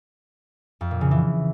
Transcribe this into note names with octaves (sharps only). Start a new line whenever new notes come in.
F2
A#2
C#3
E3